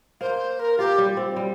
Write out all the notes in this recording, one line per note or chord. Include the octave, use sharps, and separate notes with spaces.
A#3 C5
A#4
F4 G4
G3
C4
G3